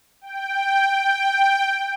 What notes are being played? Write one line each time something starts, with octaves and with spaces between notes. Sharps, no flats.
G5
G5